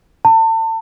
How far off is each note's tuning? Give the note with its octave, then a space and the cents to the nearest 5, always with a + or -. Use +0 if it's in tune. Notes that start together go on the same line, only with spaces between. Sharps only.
A5 +35